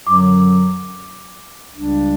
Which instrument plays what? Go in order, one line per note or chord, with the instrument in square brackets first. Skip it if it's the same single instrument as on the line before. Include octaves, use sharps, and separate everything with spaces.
[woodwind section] F#2 D3 F#3 [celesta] D6
[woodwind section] C#2 C#3 G3 D4